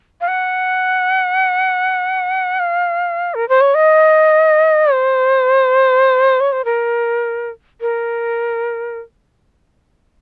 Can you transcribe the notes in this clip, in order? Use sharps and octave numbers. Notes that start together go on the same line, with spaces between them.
F5
F#5
F5
A#4
C5
C#5
D#5
C5
C#5
C5
A#4
A#4